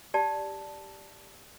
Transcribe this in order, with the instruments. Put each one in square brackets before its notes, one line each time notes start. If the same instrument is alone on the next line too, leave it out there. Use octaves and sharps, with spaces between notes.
[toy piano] G4 D5 A5